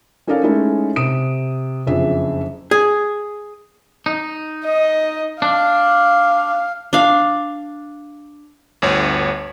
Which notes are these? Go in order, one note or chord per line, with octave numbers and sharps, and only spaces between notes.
C#4 D#4 A4 A#4 D5 F5
G#3 A3 C#4 D#4 E4 A4
C3 D#6 D7 E7
F#1 F2 D4 G#4 E5
G#4
D#4
D#5
D4 F5
D4 F5
G1 D2 C#5